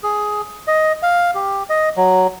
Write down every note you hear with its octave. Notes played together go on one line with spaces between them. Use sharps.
G#4
D#5
F5
G4
D#5
F#3